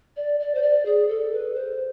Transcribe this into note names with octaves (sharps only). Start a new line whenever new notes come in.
D5
D5
C5
D5
G#4
A4
B4
C5